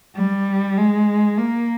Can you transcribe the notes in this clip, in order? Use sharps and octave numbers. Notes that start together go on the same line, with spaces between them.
G3
G#3
A#3